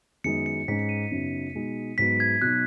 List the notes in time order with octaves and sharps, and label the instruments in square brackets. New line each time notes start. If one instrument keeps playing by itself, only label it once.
[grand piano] F#2 D#3 G#3 B3 D#4 [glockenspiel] C#7
[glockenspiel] C#7
[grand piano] G#2 G#3 C#4 [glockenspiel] B6
[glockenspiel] C#7
D#7
[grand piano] F#2 C#3 B3 D#4
B2 G#3 D#4
[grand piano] G#2 F#3 B3 [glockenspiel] B6
[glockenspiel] G#6
[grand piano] B2 F#3 D#4 [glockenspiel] F#6